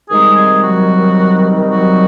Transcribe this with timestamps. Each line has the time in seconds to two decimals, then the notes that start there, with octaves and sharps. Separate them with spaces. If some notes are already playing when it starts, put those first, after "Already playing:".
0.10 C3 D#3 G3 G#3 C4 D#4 G#4
0.37 G#3 G#4
0.63 F#3 F#4
1.70 F#3 F#4